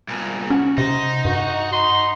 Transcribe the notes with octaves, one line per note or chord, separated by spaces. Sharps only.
C2 A#2
C#4 F#4
C3 D#4 C5
G2 F#4
C6